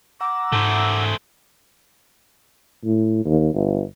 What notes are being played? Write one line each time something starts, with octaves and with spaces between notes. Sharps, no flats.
F#5 A#5 D6 E6
G#2 A3 C5
A2
D#2
G1